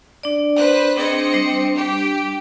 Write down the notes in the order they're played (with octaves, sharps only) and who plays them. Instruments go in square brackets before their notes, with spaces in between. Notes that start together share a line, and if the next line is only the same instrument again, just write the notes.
[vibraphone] D4 D5
[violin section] B4 C5 F#6
[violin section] C4 D#5 C#7 [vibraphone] D4 G#4
[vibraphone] G3 D4
[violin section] G4